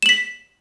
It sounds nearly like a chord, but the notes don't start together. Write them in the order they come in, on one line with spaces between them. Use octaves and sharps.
E7 F#7 B6